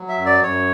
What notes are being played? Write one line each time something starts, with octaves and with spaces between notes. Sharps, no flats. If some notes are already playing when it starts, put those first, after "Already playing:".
Already playing: F#3
E5
F#2
D5
F#2 C#5